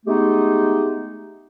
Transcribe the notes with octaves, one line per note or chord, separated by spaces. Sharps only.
G#3 A3 B3 D#4 G4